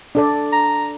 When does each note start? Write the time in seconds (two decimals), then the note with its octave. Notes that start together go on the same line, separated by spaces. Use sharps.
0.15 D4 A4 D5
0.53 A#5